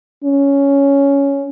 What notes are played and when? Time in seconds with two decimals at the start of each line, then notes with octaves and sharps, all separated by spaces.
0.24 C#4